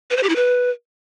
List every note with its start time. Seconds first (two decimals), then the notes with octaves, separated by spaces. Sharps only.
0.10 B4
0.17 C5
0.23 G4
0.29 E4
0.36 B4